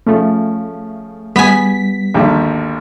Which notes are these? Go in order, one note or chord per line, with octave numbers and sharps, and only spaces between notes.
C#3 F3 A3
G3 B3 G#5 B6
G#1 D#2 D3